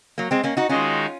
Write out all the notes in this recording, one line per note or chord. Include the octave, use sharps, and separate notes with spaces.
F#3 A#3
G#3 C4
A#3 C#4
D#4 F#4
D#3 G#3 C#4 D#4 F4 F#4